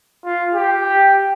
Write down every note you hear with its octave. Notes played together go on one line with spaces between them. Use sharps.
F4
G4